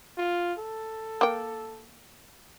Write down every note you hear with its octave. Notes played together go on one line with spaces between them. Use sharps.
F4
A4
A#3 G5